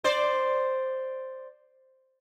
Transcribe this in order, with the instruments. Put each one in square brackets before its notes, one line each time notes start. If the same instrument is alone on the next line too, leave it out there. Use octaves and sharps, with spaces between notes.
[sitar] C5 D5